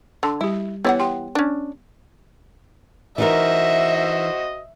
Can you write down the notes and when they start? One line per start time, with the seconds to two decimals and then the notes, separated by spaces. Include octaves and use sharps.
0.23 D3 A5 C6
0.41 G3 E4 G4
0.85 E3 B3 E4 G4 C#5 F#5
0.99 G4 G5 C6
1.35 C#4 D4
3.18 E3 D#4 F#4 A#4 C5 D#5 E5